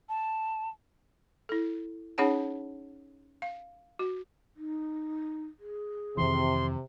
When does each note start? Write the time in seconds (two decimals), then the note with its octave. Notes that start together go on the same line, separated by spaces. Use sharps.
0.09 A5
1.49 E4 A4
2.18 C#4 D#4 G#4 C#5 F#5 A5
3.42 F5
3.99 F#4
4.56 D#4
5.59 G#4
6.17 F2 C3 D#3 E3 C6